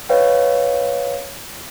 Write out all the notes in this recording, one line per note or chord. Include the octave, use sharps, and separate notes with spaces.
B4 C#5 D#5 F5 G5